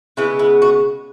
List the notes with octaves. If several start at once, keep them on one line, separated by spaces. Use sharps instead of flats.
C#3 G#3 B3 E4
E4
F#4